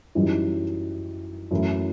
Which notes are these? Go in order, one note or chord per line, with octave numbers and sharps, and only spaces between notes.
F#2 E3 G3 D#4
F#2 E3 A3 E4